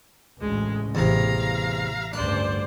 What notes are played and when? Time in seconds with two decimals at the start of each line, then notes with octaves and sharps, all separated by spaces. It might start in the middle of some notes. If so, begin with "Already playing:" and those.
0.41 A1 D2 C#3 G#3
0.95 A1 E2 C3 F5 A#5
2.13 D2 G2 C#3 D4 C5 D5